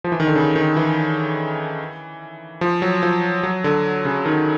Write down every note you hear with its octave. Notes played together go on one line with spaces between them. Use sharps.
F3
E3
D#3
D3
C#3
D#3
E3
F3
F#3
F3
F#3
D3
C#3
D#3